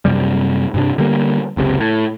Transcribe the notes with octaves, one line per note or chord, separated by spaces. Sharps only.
F#2 C3 G3
G2 C3 D4
D3 G3 A#3
F#1 C#2 C3
A2